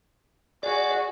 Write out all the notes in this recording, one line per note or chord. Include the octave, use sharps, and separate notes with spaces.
F#4 G#4 D5